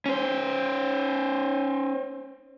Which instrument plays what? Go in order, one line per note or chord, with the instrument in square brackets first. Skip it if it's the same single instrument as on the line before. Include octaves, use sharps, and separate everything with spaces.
[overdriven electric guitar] C#4 C5